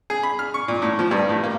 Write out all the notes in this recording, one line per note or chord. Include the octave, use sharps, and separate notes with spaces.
G#4
B5
F6
C#6
A#2
A2
F3
G2
A2
A#3